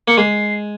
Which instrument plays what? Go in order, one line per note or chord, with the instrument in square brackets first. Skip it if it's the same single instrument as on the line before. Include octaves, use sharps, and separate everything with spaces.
[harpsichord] A#3 [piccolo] C#7
[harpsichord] G#3 [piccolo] C7